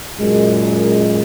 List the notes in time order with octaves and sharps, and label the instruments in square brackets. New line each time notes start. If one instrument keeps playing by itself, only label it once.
[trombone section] F#2 A#2 G#3